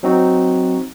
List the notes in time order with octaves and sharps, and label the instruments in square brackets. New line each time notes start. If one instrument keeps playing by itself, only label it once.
[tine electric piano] F#3 C4 D#4 F#4